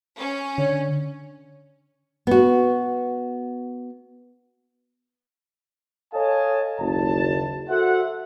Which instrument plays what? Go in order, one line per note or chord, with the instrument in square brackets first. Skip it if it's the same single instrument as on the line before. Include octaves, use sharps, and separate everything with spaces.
[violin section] C#4
[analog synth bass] D3 [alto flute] C#5
[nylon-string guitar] B3 F#4
[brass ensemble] A4 C#5 D#5 F5 G#5 A5
F#1 D#2 A5
F#4 A4 C5 E5 F#5